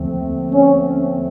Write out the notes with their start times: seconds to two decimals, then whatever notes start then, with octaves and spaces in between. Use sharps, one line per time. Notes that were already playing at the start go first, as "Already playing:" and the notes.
Already playing: D#2 D3 F3 A3 C4
0.52 C#4